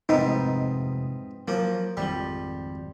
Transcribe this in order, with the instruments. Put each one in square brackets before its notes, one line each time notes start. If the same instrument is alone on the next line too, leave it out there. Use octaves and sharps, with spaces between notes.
[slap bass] F1 E2 [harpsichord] G#2 B3 C4 [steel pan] D#4
[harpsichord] F3 A#3 [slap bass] F#3
[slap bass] G#1 F2 F3 [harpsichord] G3